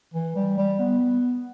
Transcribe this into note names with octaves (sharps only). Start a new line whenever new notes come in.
E3
G3
G3
B3